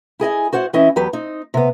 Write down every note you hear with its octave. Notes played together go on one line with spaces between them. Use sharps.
E4 G#4 D#5 G#5
F#4 C5 C#5 F#5
E3 C4 C#4 E4 D#5
E2 F#3 G4 B4
C4 D#4
C3 B3